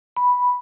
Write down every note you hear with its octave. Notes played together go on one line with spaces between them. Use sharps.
B5